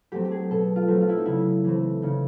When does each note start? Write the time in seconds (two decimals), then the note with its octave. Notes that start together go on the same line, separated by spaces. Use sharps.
0.12 F#3 A3 C4 G4
0.25 G4
0.31 G#4
0.50 B2 A4
0.76 F4
0.88 F#3 A3 C4
1.01 F4
1.09 E4
1.17 D#4
1.26 C#3 E4
1.64 E3 A3 C4
2.02 C#3 D#4